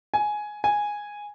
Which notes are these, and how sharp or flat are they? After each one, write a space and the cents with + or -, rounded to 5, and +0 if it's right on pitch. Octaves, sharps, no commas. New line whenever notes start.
G#5 +10
G#5 -5